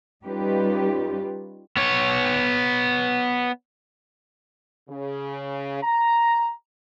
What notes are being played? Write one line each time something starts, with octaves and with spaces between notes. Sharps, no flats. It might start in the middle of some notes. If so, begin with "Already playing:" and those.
G3 C#4 D#4 F4 G4 B4
B3 C#5
C#3
A#5